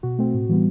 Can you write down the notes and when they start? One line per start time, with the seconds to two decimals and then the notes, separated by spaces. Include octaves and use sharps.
0.03 B2 F#4
0.19 A3 C4
0.34 A2
0.49 E3 G3 B3